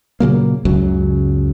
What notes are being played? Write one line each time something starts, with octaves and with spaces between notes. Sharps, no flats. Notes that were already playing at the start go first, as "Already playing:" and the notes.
A#2 C#3 F#3 A#3
C#2 F#2 C#3 F#3